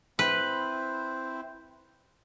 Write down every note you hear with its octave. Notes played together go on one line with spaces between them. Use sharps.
C4 E4 B4 C5